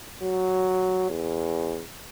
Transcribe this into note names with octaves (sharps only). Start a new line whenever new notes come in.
F#3
E2